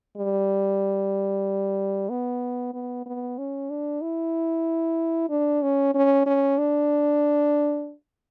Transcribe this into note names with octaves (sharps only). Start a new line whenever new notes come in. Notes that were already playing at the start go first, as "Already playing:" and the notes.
G3
B3
B3
B3
C#4
D4
E4
D4
C#4
C#4
C#4
D4